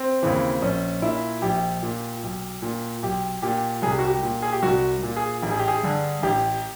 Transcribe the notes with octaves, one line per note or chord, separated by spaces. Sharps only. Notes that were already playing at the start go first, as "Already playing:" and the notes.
Already playing: C4
D#2 C#3 E3
A#1 C#4
A#2 E4
A#1 G4
A#2
B1
A#2
B1 G4
A#2 G4
C2 G#4
G4
F#4
G4
A#2
G#4
G4
C2 F#4
A#2
G#4
A1
G#4
G4
G#4
G2 D3
A1 G4